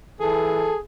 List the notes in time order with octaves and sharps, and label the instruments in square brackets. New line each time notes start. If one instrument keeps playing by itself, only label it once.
[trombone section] E3 A4 [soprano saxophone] G#4